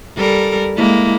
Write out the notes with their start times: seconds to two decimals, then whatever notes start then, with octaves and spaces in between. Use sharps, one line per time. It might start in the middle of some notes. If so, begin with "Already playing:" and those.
0.16 G3 A4 A#4
0.76 G#3 A#3 E4